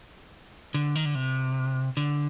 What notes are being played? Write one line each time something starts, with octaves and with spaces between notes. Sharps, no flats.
D3
D#3
D3
C3
D3